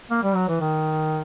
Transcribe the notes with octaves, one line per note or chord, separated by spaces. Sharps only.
A#3
G3
F#3
E3
D#3